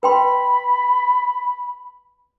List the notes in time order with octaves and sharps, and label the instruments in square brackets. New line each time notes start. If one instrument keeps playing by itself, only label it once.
[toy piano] B4 G5 C6 [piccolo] B5